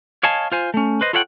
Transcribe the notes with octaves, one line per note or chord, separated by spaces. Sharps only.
C#5 D#5 F5 G#5 A5
F4 C5 G#5
A3 C#4
B4 C5 D#5
F4 A4 C#5 E5 F#5 G5